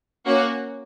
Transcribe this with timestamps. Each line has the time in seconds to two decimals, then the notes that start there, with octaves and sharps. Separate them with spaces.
0.26 A#3 C#4 F#4